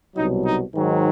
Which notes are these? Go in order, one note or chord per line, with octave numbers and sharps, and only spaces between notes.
C2 B2 F#3 D#4
D#4
G#2 D#3 F#3